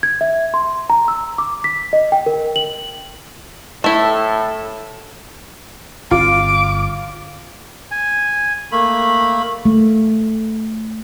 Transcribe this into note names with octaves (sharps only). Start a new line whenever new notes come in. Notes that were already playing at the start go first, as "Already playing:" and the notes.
G#6
E5
C6
A#5
E6
D6
B6
D#5
G5
A#4
F#7
A2 A3 E4 A4
G1 C4 F4 D6
G#5
A3 A#3 B5
A3